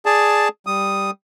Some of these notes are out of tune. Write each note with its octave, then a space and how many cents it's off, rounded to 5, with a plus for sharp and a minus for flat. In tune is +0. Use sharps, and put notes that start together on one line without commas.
G#4 +5 D5 +0 A5 +0
G3 +0 D#6 +0